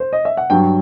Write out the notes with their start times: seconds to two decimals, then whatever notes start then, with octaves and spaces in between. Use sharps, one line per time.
0.00 C5
0.13 D#5
0.25 E5
0.37 F#5
0.50 G2 F#3 G5